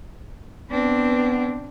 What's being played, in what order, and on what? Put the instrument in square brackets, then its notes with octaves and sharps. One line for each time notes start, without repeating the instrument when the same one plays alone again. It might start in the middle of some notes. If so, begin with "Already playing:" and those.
[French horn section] B3 [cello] C4 D4